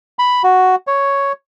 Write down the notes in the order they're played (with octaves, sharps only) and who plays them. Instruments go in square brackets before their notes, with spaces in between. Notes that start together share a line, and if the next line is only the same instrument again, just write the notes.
[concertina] B5
F#4
C#5